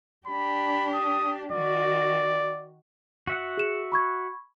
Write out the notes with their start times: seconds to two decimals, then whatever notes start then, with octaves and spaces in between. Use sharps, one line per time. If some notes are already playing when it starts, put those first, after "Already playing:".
0.27 D4 G4 B5
0.94 D#6
1.52 D#3 F#4 D5
3.27 F#4 E5 F#5
3.57 G#4 E7
3.92 B5 C#6 G#6